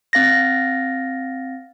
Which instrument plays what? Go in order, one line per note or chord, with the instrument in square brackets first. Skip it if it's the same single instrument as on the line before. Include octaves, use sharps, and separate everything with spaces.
[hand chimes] C4 F5 A6 A#6